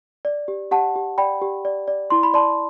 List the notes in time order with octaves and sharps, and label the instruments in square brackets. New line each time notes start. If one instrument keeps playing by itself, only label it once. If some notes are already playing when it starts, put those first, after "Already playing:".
[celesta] D5
G4
G4 F#5 A5
G4
D5 G5 B5
G4
D5
D5
E4 C6
B5
D5 A5 C6